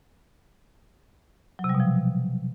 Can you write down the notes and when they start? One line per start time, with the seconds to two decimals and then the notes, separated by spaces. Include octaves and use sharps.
1.59 F#3
1.64 C3
1.69 G3
1.75 B2
1.80 F3